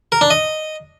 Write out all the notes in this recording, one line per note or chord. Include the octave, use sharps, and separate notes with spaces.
A#4
D4
D#5